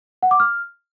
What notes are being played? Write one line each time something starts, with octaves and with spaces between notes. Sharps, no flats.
F#5
D6
F6